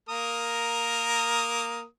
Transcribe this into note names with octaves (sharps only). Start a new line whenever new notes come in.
A#3 A#4 D#6